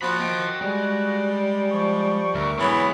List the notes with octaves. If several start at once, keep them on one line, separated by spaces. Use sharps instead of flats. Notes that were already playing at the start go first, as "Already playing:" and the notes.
F3 A#3 F#4 B5
F#4 D#5 G5
G3 G#3
F3 C#6
D2 A#4 E5
E3 F#3 G#3 B3 E4 C#5 F#6